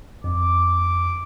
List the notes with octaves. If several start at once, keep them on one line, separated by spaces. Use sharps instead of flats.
F2 D6